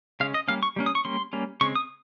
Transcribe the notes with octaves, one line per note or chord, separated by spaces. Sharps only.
C#3 G#3 C#4 F5
D#5
G3 A#3 C#4 F5
C#6
G3 A#3 C#4
D#6
C#6
G3 A#3 C#4 C6
G3 A#3 C#4
C#3 G#3 C4 C#6
D#6